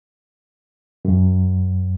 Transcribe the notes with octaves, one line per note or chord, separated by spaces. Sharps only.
F#2